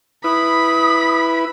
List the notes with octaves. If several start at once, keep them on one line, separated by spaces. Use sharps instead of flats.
E4 B4 B5 D#6